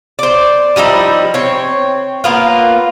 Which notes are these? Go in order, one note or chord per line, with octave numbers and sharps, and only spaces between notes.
C5 D5
F3 G3 D#4 E4
C4 C#5
A#3 B3 F4